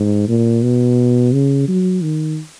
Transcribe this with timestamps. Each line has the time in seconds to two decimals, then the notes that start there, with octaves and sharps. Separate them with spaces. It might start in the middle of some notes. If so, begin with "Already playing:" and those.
Already playing: G#2
0.28 A#2
0.63 B2
1.33 C#3
1.68 F#3
2.03 D#3